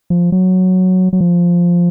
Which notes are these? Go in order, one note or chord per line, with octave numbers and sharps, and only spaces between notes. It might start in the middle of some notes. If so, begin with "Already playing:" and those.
F3
F#3
F#3
F3